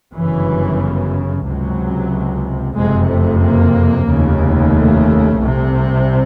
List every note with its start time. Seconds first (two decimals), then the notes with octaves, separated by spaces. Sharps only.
0.15 G1 F#2 C#3 E3
1.46 C#2 C3 F#3
2.75 F#1 F2 C3 G#3
3.08 A3
3.41 A#3
4.06 F1 D#2 C#3
4.71 A3
5.37 C2 C3